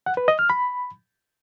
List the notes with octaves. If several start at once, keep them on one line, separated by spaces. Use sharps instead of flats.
F#5
B4
D#5
F6
B5